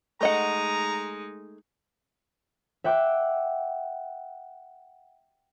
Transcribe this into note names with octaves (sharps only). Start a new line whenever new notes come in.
G#3 A3 D#4 D#5 F#5 A#5
E5 F#5 G5 D6 F#6